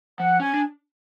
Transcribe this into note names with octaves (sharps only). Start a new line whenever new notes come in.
F3 F#5
C#4 G#5
D4